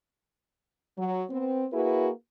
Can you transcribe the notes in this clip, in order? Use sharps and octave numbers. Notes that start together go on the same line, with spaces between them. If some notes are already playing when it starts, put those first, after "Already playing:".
F#3
B3 C4
A#3 E4 F#4 G#4 B4